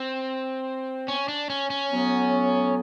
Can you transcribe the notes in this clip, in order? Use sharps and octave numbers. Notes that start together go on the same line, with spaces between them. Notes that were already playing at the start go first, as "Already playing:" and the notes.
Already playing: C4
C#4
D4
C#4
C#4
A2 F#3 B3